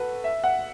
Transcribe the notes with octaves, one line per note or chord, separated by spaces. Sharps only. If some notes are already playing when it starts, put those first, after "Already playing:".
Already playing: F#4 A4 B4
E5
F#5